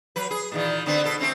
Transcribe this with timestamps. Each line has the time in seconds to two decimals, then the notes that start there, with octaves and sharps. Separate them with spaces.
0.16 F#3 B4
0.31 G#4
0.52 A#2 D#3 E3
0.86 D3 B3 C4
1.04 B2 A4
1.20 A3 C4 C#4